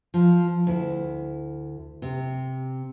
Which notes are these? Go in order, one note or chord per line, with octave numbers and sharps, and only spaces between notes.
F3
D2 E4
C3